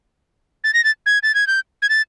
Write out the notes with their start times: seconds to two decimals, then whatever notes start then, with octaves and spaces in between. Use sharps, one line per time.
0.64 A6
0.74 A#6
0.84 A6
1.06 G#6
1.23 A6
1.35 G#6
1.47 G6
1.82 G#6
1.89 A6